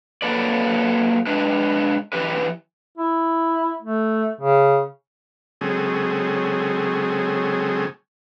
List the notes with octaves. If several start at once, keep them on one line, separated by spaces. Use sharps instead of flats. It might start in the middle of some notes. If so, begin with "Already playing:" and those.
F#3 A#3 A4 B4 D5
G#3 D4 B4
E3 G4 B4
E4
A3
C#3
C#3 F#3 G#3 C4 G#4 A4